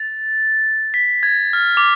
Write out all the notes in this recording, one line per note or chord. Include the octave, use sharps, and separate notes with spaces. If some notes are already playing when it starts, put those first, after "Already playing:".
Already playing: A6
B6
G#6
F6
D6